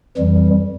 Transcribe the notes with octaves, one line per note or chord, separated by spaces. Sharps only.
F2 E3 G3